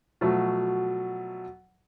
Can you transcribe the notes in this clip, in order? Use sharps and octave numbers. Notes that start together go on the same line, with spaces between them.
B2 F3 F#3 A3